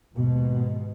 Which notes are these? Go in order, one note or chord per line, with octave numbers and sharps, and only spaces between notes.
D#2 G#2 B2